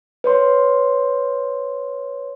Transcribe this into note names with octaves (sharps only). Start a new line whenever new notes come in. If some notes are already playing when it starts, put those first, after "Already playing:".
B4 C#5 C6